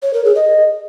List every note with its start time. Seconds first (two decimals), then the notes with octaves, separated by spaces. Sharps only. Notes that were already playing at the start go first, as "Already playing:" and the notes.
0.03 C#5
0.14 A#4
0.25 G#4
0.35 D#5